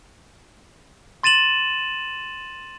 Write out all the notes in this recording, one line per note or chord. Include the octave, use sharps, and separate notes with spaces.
C6 A6 D#7 E7 F#7